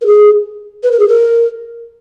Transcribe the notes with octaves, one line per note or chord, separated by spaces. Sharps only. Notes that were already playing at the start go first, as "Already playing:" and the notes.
A#4
G#4
B4
A#4
G#4
A#4